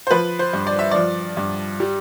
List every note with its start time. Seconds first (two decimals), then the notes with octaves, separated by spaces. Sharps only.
0.07 C5
0.11 F3 B4
0.39 C5
0.53 G2
0.67 D5
0.79 E5
0.91 F3 D5
1.37 G2
1.80 G3